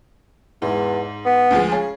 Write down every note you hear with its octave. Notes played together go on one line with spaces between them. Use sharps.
E2 G#2
B3
D2 F3 G#3
C#3 G#4